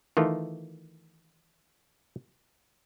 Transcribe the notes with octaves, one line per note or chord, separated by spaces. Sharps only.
D#3 E3 A3 F4